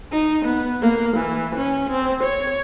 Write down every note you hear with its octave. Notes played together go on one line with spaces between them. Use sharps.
D#4
B3
A#3
E3
C#4
C4
C#5